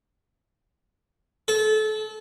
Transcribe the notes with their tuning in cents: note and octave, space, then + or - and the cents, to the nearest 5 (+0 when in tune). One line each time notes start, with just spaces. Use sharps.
A4 -30